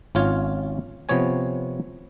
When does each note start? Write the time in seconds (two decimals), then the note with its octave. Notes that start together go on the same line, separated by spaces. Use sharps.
0.15 G#1 C#4 F4 C#5
1.09 C3 F3 B3 C#5 G#5